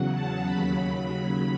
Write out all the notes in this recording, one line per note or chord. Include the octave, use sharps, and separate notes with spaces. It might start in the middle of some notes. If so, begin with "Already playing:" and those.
Already playing: E2 C#3 F#3 F#5
A5
D#2 C#3 F#3 B5